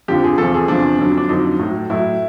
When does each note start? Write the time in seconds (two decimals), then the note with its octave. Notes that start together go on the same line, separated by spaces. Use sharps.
0.08 F2 D3 F3 G4
0.24 G#4
0.38 E2 C3 F3 A4
0.54 G#4
0.68 E2 C3 F3 D4
0.99 F2 D3 F#3
1.18 D4
1.29 F2 D3 F#3 D#4
1.60 A2 F#3
1.90 A2 F#3 E4